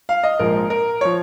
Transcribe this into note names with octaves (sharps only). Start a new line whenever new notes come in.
F5
D#5
A#1 G#2 F3 A#4
A#4
F3 C#5